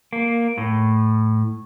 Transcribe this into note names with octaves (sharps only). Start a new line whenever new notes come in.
A#3
A2